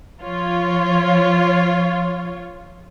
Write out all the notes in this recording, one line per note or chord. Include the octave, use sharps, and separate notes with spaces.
F3 F4 C#5